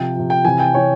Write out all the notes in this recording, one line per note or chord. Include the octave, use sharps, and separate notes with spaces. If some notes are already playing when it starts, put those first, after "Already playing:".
Already playing: C3 F3 G5
C3 F3
G5
C3 E3 G#5
G5
C3 E3 C#5